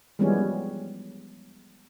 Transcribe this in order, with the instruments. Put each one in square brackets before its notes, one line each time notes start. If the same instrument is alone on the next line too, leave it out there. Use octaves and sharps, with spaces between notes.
[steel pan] E3 F3 G3 G#3 B3 C#4